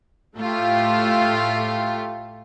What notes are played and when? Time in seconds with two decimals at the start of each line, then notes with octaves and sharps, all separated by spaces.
0.37 A2 A3 F4 G4